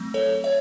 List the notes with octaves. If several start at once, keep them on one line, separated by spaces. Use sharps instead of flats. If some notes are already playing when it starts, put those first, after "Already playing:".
Already playing: F#3 A3 C4
A4 C#5
C#5 E5